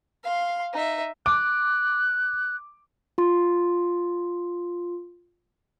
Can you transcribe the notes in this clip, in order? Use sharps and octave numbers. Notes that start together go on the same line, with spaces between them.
F5 C6
D#4 E5
D6 F#6
F4 C6